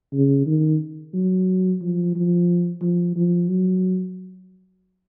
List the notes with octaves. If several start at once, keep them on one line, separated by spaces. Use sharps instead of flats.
C#3
D#3
F#3
F3
F3
F3
F3
F#3